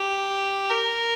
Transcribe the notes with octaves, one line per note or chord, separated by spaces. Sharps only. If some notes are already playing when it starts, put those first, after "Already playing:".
Already playing: G4
A#4